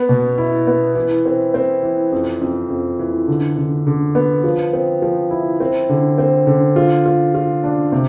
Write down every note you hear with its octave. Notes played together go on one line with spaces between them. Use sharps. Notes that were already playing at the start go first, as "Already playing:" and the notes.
Already playing: B3
B2
E4
B3
E3
C4
C4
E3
F2
F2
F2
E3
D3
D3
D3
B3
F3
C4
F3
E4
C4
D3
C4
D3
F4
F4
F4
D4
C3